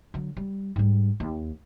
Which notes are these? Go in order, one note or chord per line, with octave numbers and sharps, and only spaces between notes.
D3 F#3
G3
G#2 G3
D#2